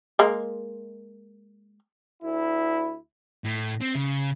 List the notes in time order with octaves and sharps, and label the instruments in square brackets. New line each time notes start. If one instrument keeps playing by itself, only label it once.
[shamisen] G#3 A#3
[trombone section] D2 E4
[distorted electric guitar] A2
C4
C#3